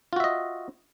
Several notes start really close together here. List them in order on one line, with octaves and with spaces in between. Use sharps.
F4 F#4 E5 D#5